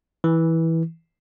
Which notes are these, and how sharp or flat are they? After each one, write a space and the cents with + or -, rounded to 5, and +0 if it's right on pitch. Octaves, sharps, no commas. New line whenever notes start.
E3 -15